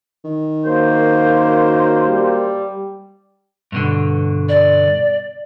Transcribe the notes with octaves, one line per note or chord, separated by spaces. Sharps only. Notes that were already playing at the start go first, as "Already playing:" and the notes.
D#3
F#2 A#3 C5
G3
G2 B2 D3
D5